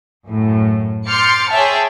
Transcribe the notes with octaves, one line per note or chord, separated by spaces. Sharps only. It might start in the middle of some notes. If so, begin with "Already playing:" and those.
F#2 A2
C6 D6 F6 G6 A6 C#7
G#4 C#5 E5 G5 A5